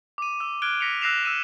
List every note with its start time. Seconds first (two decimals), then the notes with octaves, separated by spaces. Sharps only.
0.18 D6 D#7
0.40 D6 E6
0.62 D6 F6 F#6 G#6 D7 G7
0.80 A#6 B6 C#7 F7
1.01 E6 F#6 A#6 C7 E7 F7
1.24 E6 D#7 E7